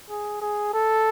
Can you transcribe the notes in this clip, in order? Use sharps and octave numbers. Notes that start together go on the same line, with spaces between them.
G#4
G#4
A4